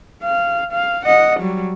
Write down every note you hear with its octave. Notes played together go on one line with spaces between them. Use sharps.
F5
F5
D#5 F#5
F#3 G3